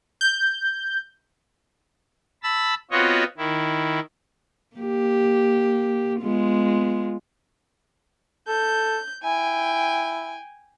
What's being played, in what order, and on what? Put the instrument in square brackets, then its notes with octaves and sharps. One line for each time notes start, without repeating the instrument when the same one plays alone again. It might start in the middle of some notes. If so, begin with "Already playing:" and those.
[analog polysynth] G6
[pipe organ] A5 B5 E6
B3 C4 F4 F#4 C#5 D#5
D#3 E4
[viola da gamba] A#3 G4
G#3 B3 F4
[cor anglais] A4 [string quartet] G6
[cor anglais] E4 [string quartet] G5 G#5